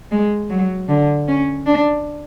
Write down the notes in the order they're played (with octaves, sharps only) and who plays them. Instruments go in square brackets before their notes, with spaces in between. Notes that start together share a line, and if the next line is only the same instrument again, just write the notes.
[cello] G#3
F#3
D3
C#4
D4